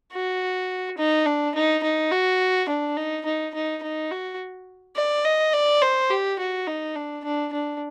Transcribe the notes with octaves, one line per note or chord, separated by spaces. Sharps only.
F#4
D#4
D4
D#4
D#4
F#4
D4
D#4
D#4
D#4
D#4
F#4
D5
D#5
D5
C5
G4
F#4
D#4
D4
D4
D4